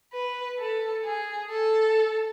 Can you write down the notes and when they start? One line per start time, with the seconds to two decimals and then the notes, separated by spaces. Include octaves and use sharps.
0.13 B4
0.59 A4
1.04 G#4
1.50 A4